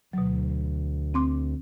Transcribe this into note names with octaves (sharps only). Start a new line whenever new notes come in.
D2 B2 F#3
C4 C6 D6